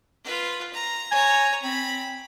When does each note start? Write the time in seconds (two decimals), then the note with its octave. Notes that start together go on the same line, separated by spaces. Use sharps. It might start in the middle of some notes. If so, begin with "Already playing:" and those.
0.24 F4 B4
0.73 A#5
1.11 C#5 G#5 A#5
1.63 C4 B5